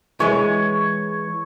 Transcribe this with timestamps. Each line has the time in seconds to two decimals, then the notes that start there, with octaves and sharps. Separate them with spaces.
0.20 E3 G#3 C#5